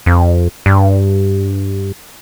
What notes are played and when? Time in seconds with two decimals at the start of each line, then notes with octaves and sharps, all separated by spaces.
0.06 F2
0.66 G2